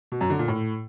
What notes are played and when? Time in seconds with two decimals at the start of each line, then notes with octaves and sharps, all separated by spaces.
0.12 B2
0.21 F#2
0.30 D3
0.39 A#2
0.48 A2